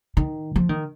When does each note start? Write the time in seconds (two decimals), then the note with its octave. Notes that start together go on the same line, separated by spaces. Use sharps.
0.17 D#3
0.56 F3
0.69 D#3